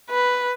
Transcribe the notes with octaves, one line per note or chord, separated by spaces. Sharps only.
B4